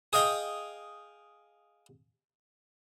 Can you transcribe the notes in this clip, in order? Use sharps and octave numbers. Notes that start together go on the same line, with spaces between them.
G#4 D#5 F5 G5